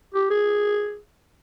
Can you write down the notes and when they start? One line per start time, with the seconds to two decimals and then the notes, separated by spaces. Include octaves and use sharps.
0.14 G4
0.30 G#4